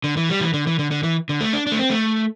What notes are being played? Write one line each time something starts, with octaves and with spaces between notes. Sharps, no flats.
D3
E3
G3
E3
D3
E3
D3
D3
E3
D3
A3
D4
D4
A3
C4
A3